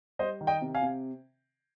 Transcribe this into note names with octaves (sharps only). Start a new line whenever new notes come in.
G3 C5 D#5
D#3
D#5 G5
C3
F5 G#5
C3